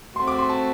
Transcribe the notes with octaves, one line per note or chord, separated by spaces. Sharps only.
A3 C4 F#4 C6
D6
C6
A5